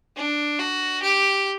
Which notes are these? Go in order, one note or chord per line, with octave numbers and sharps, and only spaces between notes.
D4
F#4
G4